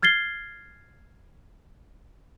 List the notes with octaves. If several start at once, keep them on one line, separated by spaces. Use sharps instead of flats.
F6 G#6 A6 C7 G7